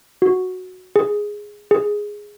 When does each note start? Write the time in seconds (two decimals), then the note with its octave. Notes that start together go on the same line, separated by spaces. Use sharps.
0.22 F#4
0.96 G#4
1.71 G#4